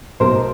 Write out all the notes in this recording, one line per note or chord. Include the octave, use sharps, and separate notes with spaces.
B1 A#4 C5